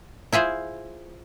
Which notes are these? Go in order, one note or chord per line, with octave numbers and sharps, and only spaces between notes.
E4 F4 G#4 C5